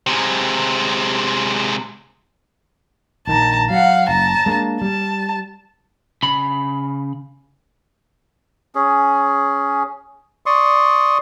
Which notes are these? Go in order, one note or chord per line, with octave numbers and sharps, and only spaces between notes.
C3 G#3
A#1 D#3 A5 A#5
F#3 F5 F#5
F#1 A5 A#5
G#3 A#3 D4
G3 A5
C#3 B5
C#4 G#4
D5 C6 C#6 D#6